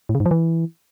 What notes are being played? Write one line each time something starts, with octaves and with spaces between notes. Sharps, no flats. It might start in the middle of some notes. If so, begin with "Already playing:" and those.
A2
C#3
G#2
F3
E3